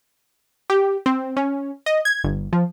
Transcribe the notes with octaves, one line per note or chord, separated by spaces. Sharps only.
G4
C4
C#4
D#5
G#6
G1
F3